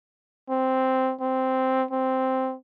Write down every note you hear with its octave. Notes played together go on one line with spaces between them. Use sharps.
C4
C4
C4